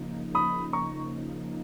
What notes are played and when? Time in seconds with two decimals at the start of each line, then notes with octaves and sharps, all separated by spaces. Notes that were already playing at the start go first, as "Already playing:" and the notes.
Already playing: C#3 F3 A#3 D#4
0.35 B5 D#6
0.73 A#5 C#6